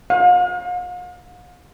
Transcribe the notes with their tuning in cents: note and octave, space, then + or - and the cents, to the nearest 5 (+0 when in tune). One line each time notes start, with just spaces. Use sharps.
F5 +45